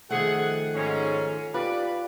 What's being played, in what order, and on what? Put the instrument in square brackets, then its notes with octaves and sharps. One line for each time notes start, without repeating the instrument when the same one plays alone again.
[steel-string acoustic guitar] D#3 F3 A3 [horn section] G#4 F#5
[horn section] G#2 C#4
[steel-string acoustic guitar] F4 [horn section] G4 B4 D5